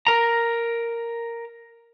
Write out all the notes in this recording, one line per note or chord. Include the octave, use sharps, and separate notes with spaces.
A#4 A#5